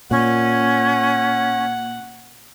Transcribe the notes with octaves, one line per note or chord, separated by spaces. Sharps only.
A#2 C#4 F#5